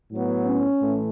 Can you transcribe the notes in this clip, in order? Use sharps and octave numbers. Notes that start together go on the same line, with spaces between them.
A2 F#3 B3
C#4
A2 E3 A3